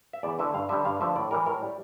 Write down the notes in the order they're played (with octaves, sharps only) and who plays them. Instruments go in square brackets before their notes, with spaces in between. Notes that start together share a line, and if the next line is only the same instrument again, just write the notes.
[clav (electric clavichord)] E5
E2 D5
D3 A3 E5
G2 F5
D3 G3 E5
G2 F5
D3 F3 A3 E5
A2 D5
E3 G3 A#4
A2 A#4
G3